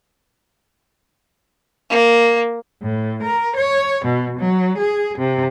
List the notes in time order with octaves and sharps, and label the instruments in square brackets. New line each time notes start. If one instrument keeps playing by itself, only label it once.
[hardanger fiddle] A#3
[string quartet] A2
A#4
C#5
B2
F#3
G#4
C3